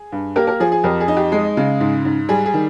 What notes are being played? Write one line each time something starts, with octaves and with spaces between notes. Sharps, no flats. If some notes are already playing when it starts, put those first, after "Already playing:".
Already playing: G#4
G2
A#3 G4 A#4
G4 A#4
F3 G#4
G#4
F2 G4 A#4
G#4
D#4
G4
G#3
C#3
G#2
G#2
G3 G#4
G#4
D#3